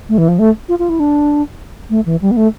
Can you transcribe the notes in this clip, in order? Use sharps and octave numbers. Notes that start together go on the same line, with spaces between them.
A3
E3
F3
A3
F4
F4
E4
D4
A3
E3
G3
B3
A3